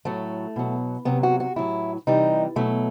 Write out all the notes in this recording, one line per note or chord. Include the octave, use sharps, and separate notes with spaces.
A2 F#3 A3
B2 F#3
C3 F#3 B3
F#4
F#4
A2 F#3 E4
C3 E3 G3 D#4
B2 F#3 A3